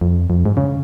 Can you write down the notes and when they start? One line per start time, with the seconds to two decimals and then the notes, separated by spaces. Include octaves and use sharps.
0.01 F2
0.30 F2
0.45 G#2
0.57 C#3